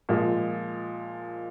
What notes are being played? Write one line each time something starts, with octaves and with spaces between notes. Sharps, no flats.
A#2 F3 G#3